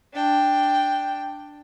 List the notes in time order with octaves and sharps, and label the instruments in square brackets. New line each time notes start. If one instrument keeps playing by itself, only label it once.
[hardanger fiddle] D4 G5